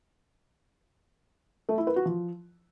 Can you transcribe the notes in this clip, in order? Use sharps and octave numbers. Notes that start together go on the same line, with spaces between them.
A3
E4
B4
F#4
F3